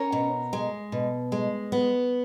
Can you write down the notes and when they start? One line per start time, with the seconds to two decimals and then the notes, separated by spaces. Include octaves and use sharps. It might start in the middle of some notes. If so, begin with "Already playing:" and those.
Already playing: C#4 A#4 C#5
0.12 B2
0.53 G#3
0.92 B2
1.32 G#3
1.72 B3